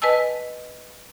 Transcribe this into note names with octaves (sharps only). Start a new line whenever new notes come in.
B4 D#5 G#5 A5 E6